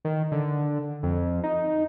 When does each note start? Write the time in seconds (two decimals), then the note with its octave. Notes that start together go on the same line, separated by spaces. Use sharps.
0.05 D#3
0.32 D3
1.03 F2
1.43 D#4